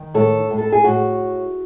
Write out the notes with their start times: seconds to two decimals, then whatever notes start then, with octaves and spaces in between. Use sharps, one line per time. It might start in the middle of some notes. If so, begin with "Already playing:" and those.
Already playing: D#3
0.14 A2 A4
0.50 A2
0.58 A4
0.72 G#4
0.84 A2 F#4